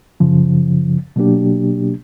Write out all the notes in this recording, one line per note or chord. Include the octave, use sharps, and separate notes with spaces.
F#2 C#3 F3
B2 F#3 A#3 D4 G4